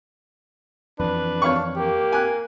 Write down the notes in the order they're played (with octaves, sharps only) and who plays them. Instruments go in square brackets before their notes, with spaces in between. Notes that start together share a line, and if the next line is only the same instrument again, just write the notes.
[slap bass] F2 E3 [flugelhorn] D4 [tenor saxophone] B4
[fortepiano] C#5 F5 C#6
[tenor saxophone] A#3 [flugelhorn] G4
[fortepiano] G#5 F#6